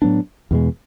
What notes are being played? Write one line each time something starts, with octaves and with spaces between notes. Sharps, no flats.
A2 F#3 B3 D4
E2 B2 G#3